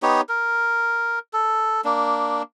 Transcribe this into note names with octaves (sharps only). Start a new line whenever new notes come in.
B3 D#4 G4 C#5
A#4
A4
A#3 D4